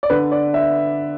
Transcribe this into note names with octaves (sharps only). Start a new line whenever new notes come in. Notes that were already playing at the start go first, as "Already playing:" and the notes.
D5
D3 B4
D5
E5